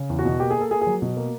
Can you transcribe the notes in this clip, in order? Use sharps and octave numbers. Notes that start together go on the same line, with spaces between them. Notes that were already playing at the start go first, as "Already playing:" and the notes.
Already playing: C#3
E2
F#4
B2
A#3 G4
A#3 G#4
A4
A#3 G#4
G#4
F#3
B2
A#3